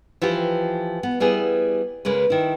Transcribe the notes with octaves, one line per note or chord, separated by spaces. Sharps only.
E3 F3 F4 G4
B3
G3 B3 E4 G#4
C#3 G#3 A#3 B4
D#3 E4